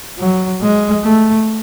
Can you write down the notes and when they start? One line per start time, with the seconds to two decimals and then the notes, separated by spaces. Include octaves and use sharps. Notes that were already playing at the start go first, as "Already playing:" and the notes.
0.19 F#3
0.61 G#3
1.04 A3